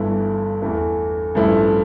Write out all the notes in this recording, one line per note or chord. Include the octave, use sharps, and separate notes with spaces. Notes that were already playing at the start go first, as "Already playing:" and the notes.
Already playing: G1 G2 E3 A3 E4
E2 E3 A3
A1 G2 F3 A3 E4